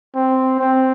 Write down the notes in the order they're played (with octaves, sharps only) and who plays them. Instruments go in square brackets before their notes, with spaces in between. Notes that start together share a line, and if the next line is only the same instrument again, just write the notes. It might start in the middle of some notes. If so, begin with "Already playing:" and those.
[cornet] C4
C4